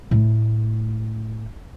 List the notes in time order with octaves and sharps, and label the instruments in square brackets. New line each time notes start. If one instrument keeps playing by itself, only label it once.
[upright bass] A2 A3